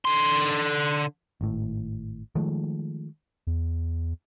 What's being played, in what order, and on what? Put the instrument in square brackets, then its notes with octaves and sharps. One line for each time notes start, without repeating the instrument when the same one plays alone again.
[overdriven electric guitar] D3 C6
[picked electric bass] G#1 A2
D#3 F3 G#3 A3
[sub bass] E2